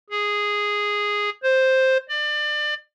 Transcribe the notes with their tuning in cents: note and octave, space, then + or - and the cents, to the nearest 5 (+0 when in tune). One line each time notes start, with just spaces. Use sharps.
G#4 -5
C5 +5
D5 +30